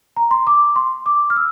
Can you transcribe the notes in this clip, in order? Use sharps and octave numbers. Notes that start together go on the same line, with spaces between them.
A#5
C6
D6
C6
D6
F6
E6